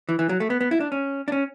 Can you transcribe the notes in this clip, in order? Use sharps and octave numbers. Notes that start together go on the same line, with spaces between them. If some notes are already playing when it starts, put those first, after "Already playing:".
E3
E3
F#3
A3
B3
B3
E4
D4
C#4
D4
C#4